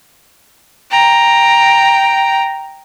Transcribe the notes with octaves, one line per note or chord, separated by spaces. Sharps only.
G5 A#5